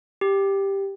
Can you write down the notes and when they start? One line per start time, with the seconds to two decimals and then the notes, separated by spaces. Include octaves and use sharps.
0.21 G4